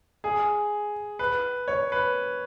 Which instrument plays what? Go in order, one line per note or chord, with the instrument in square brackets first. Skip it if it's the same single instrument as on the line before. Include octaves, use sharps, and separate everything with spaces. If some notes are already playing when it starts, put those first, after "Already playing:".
[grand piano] G#4
B4
C#5
B4